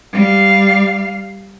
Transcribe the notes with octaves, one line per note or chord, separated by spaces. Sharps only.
G3 F5